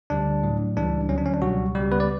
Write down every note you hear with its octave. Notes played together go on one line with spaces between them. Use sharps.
D2 D3 G3 D4
A2 F#3
C#2 C#3 E3 G3 D4
D2 D3 F#3 C#4
D4
C#4
D4
C#2 B2 F#3 G3 F#4
C#2 C#3 G3 G4
B3 B4
D5